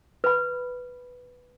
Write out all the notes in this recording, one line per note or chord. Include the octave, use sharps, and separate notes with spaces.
B4 B5